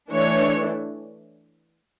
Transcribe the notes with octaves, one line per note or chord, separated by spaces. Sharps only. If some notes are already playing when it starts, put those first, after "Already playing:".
E3 A3 D4 C#5